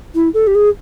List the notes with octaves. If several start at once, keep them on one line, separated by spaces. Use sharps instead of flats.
E4
A4
G4
G#4